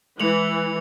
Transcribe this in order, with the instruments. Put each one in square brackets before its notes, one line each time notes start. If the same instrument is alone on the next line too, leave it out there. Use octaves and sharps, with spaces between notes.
[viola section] E3 [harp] G#3 [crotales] C#7 F7 F#7